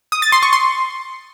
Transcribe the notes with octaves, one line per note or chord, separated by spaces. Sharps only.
D#6
A6
C6
C#6
C6